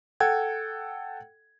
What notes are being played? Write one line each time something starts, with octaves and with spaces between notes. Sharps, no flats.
A4 F#5 G5 G#6